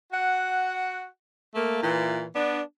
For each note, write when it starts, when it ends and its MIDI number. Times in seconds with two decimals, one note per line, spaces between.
0.13 1.07 66
0.13 1.07 78
1.55 1.81 57
1.55 1.81 58
1.82 2.25 46
1.82 2.25 52
2.35 2.60 59
2.35 2.60 62